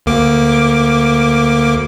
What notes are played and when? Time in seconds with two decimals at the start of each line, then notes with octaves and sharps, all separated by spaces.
0.06 D2 A#3 D6